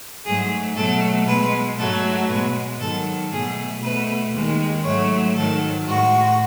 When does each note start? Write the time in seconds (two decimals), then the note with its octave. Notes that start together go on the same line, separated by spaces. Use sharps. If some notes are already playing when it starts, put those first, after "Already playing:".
0.24 G#2 F#3 A3 G#4
0.75 B2 F#3 A3 A4
1.26 B2 G#3 B4
1.78 G#2 F#3 A3 A4
2.28 B2 G#3 B4
2.79 G#2 D#3 F#3 A4
3.31 B2 F#3 A3 G#4
3.82 B2 A3 B4
4.32 D#2 D#3 G#3
4.84 G#2 F#3 A3 C#5
5.35 G#2 D#3 F#3 A4
5.86 A2 G#3 F#4